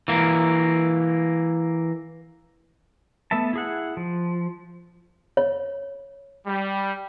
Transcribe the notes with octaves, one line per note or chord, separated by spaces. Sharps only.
E3 A#3
A3 B3 E5 A5
E4 G#4 F#5
F3
C#5
G3